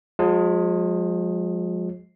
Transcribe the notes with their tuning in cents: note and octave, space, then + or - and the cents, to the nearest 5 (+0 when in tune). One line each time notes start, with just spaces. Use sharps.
F3 +40 G#3 +0